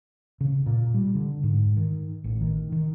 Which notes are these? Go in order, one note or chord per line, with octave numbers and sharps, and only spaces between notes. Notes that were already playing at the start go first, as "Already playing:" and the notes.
C#3
A#2
G3
D3
G#2
D#3
A1
D#3
D#3